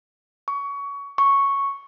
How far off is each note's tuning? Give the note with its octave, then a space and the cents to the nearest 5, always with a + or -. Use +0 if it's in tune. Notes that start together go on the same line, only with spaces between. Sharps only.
C#6 +25
C#6 -5